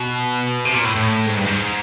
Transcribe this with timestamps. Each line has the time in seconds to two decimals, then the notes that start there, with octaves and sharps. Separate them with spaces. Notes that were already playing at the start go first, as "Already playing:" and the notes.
Already playing: B2
0.65 C3
0.74 A#2
0.85 A2
0.95 A2
1.26 G#2
1.37 G2
1.46 G#2